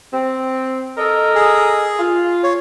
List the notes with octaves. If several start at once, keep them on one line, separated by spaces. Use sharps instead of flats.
C4
A4 A#4 D#5
G#4
F4
C#5